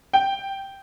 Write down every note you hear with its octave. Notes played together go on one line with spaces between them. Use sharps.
G5